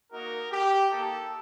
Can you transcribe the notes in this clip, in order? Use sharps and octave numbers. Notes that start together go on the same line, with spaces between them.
A#3 D#4 F#4 A#4
G4
A#3 D#4 G4 A4